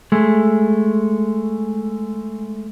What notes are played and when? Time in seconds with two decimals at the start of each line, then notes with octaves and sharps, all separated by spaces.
0.12 G#3 A3